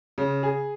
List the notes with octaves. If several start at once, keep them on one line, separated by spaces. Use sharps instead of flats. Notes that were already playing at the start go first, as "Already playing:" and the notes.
C#3
G#4